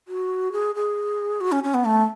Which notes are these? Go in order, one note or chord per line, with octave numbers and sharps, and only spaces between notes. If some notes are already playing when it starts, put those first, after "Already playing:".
F#4
G#4
G#4
F#4
C#4
C#4
B3
A3